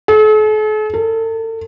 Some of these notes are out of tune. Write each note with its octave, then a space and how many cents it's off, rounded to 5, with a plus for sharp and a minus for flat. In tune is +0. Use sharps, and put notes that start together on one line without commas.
A4 -45
A4 +40